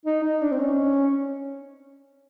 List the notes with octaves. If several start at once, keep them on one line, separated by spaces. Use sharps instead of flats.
D#4
D#4
D4
C4
C#4